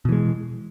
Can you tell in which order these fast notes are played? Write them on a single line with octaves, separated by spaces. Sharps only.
B2 E3 G#3